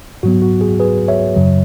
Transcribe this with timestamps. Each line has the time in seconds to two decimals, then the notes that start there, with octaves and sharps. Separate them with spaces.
0.23 G#2 F#3 B3 F#4
0.42 F#4
0.61 G#4
0.80 G#4 B4
1.08 C#5 E5
1.36 F#2 C#3 F#3